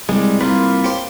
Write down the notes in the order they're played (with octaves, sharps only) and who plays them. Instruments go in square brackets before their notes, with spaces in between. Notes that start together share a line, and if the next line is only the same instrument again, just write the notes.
[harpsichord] C2 [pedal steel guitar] G3 G#3
[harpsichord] C2 [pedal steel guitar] A#3 F4 B4
[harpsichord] G4 C5